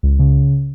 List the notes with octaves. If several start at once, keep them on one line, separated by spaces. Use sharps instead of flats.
C#2
C#3